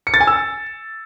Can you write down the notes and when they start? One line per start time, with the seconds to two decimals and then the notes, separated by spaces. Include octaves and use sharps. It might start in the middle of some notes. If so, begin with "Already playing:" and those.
0.07 C#7
0.14 A6
0.21 G#5
0.27 E6